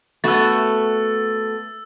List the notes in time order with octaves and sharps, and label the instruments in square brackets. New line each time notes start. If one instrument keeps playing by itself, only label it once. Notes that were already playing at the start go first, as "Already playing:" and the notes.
[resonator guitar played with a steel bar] A3 B3 F#4 [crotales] E6 A6